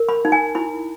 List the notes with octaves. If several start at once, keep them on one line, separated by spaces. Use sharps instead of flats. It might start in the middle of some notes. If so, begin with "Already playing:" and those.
Already playing: A#4
B5
D#4
G#5
E4 B5